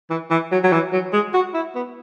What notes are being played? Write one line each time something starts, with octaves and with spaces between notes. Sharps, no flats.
E3
E3
F#3
F#3
E3
F#3
G#3
F#4
E4
B3